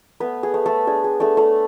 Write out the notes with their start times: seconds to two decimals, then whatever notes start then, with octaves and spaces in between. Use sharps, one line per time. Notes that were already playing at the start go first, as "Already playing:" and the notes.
0.20 A3 B3 B4
0.43 G#4
0.54 A3
0.66 A3 A4
0.87 D4 G#4
1.04 G#4
1.20 A3 D4 A4
1.37 A3 A4